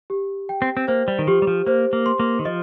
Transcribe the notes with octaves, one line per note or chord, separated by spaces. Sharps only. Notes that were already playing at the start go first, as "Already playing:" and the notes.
G4
G5
C4
C4
A#3 C5
G3
D#3
F3 G4
G3
F3
A#3 C5
A#3
C6
A#3
D#3
F3 D#5